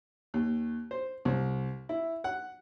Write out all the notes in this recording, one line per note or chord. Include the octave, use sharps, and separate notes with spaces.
D#2
C5
C2
E4
F#5